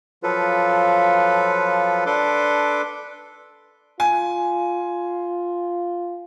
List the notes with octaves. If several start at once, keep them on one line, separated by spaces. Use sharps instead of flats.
F3 F#3 F4 A4 B4
D4 A4 B4 C6 D6
F4 G#5